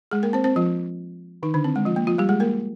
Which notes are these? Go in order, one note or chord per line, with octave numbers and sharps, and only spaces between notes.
G#3 G#4
A#3 A#4
C4 C5
C4 C5
F3 F4
D#3 D#4
D3 D4
C4
G#3
F3 F4
A#3
F3 F4
G3 G4
G#3 G#4
A#3 A#4